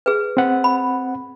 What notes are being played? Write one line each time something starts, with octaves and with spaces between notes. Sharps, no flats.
G#4 B4
C4 F#5
B5